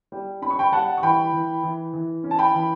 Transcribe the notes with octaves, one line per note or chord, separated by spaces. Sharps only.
G3
C#4 B5
C#6
G5 B5
G3 F#5 A5
C#6
E3 G5 B5
E3
E3
E3
C#4
A5
G5 B5
E3